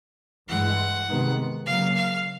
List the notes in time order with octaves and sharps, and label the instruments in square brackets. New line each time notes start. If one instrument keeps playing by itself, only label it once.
[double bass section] G2 E3 G#3 [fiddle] F#5
[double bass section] C3 D#3 G#3 B3
[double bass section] C#3 F#3 A#3 [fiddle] F5
[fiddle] F5